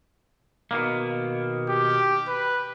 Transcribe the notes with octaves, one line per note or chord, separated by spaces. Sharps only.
B2 D#3 A#3
G4
B4